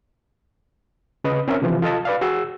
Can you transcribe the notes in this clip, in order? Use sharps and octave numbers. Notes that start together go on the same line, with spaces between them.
C#3 B4 D#5
C4 C#4 A#4 E5
C3 E3 F3
F4 A4 D#5 A5
B4 D5 F5
F#4 G#4 E6